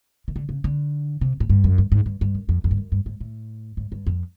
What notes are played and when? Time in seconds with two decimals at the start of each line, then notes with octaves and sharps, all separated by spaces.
0.28 D#3
0.36 D3
0.49 C#3
0.64 D3
1.21 C3
1.40 A2
1.50 G2
1.64 F#2
1.78 G2
1.92 G#2
2.06 G2
2.21 G2
2.35 F#2
2.49 F2
2.64 F2
2.71 G2
2.77 F#2
2.92 G2
3.06 G#2
3.20 A2
3.77 G#2
3.92 G2
4.06 F2